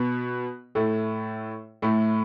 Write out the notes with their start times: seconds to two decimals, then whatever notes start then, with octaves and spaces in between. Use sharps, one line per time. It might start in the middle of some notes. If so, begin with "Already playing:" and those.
Already playing: B2 B3
0.75 A2 A3
1.82 A2 A3